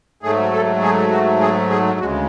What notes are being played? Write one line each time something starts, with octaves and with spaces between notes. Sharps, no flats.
G#2 F#3 A3 G#4
A4
G#4
F#4
G#4
G#4
D2 C#3 G#3 F#4